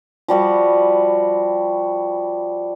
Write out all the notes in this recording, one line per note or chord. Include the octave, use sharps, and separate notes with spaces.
F3 G3 F#4 B4